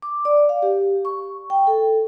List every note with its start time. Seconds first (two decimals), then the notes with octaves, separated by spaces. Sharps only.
0.02 D6
0.25 D5
0.49 F5
0.62 G4
1.05 C#6
1.50 G5
1.67 A4